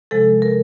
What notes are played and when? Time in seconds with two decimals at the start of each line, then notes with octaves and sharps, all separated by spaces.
0.11 C3 F3 G#3 A4
0.42 A#4